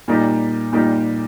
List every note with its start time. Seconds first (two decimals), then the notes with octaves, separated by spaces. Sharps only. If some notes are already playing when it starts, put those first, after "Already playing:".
0.08 A#2 G3 A#3 D#4 G4
0.73 A#2 G3 A#3 D#4 G4